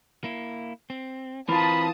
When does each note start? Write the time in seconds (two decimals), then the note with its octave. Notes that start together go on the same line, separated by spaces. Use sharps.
0.24 A#3 E4
0.90 C4
1.49 E3 C4 F4 A#4 A5 B5 D#6